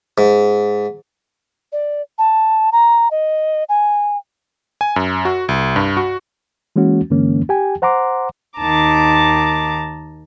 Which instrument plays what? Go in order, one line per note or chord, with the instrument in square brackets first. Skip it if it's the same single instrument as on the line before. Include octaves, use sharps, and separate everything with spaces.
[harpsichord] G#2
[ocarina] D5
A5
A#5
D#5
G#5
[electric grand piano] G#5
F#2
F#4
C2
G2
F#4
[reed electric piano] E3 G#3 A#3 C#4 F#4
G2 D3 E3 G#3 A#3 C#4
G4 G5 G#5
C5 F#5 A#5 C6 D6
[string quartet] D#2 D#3 A5 A#5 D6